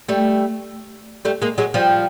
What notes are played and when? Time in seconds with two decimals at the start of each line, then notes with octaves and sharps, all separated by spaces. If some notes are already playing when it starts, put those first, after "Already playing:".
0.08 G3 A3
1.25 G3 A3
1.42 G#3 A#3
1.58 F#3 G#3
1.74 F3 G3